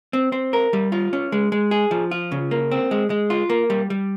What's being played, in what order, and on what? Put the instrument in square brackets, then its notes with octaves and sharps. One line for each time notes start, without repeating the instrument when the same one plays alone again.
[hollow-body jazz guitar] C4
C4
A#4
G3
F4
C#4
G#3
G#3
G#4
F3
F4
C#3
A#3
C4
G#3
G#3
F4
A#3
G3
G3